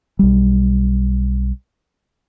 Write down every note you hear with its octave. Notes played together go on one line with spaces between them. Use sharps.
B1 G3